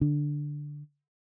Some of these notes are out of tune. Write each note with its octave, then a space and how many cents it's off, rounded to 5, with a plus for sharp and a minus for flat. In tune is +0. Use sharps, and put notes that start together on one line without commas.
D3 +0 D4 +0